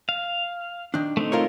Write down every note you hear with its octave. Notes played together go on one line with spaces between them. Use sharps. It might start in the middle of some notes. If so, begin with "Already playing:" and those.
F5
D#3 D4
A3 C4 D#4
F4 A#4 C#5